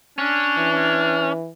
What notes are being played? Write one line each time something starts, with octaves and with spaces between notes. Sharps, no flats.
C#4 D4
E3